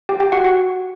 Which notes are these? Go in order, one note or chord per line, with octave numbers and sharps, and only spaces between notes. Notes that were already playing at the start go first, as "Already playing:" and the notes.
G4 G5
G4 G5
F#4 F#5
F#4 F#5